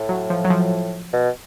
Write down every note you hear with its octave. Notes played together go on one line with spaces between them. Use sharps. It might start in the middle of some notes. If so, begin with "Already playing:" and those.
Already playing: A2
F#3
F3
F#3
F3
B2